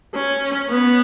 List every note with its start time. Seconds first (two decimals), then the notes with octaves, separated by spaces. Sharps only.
0.15 C#4
0.70 B3